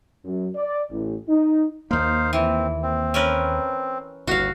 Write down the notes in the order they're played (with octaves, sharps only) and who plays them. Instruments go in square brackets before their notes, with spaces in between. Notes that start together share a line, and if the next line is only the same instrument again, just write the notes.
[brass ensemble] F#2
D5
A1
D#4
[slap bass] D#2 A#3 [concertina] D#4 C5 F5
[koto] E3 [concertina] C4
[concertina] C4
[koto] C#4 A#4 B4
[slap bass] G1 D#2 A2 [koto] F#4 F5